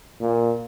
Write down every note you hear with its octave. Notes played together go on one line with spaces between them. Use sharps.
A#2